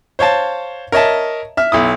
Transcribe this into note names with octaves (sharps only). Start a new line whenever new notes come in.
C5 C#5 F5 A5
A#4 C#5 D#5 E5 A5
E5 F6
B1 E4 D#6